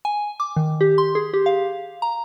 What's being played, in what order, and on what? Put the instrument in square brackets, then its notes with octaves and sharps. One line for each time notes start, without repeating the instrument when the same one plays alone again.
[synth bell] G#5
D6
D#3
G4
C6
G#4
G4
F5
A#5